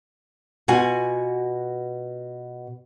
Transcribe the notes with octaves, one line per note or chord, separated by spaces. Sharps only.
B2 F4 F#4 G#5